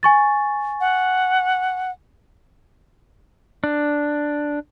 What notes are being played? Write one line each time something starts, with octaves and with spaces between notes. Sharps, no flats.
G#5 C#6 A6
F#5
D4